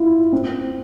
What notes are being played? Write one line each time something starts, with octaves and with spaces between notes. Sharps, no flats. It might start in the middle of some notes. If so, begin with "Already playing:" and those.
Already playing: E4 F4
C4